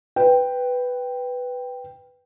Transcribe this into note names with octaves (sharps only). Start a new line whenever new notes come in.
B4 G5